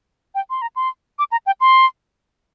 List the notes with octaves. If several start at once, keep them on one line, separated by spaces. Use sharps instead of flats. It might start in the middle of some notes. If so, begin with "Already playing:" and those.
G5
C6
A#5
C6
D6
A#5
G5
C6